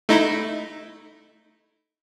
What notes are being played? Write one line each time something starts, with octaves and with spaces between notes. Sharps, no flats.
A3 D#4 E4